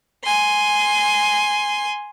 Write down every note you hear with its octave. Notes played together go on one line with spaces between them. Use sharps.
G#5 C6